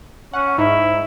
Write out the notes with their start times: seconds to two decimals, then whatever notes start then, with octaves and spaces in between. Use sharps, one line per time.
0.33 C#4 F#5
0.58 G#2 D#4 E4